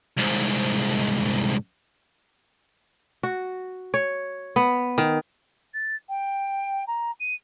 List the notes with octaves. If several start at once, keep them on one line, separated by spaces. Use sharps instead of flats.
C2 G#2
F#4
C#5
B3
D#3
A6
G5
A#5
D#7